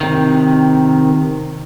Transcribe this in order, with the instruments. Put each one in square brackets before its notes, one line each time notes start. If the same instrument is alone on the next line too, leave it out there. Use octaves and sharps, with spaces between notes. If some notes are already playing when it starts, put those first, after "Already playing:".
[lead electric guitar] C3 D#3